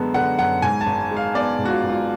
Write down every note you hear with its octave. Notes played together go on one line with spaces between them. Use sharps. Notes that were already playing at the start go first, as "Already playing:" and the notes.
Already playing: F#2 D3 G#3 B3 A5
D3 F#5
F#2 F#5
G#2 G#5
A5
G#1
G#3
F5
B3 D5
G#2
F#4
F4
G#1
F4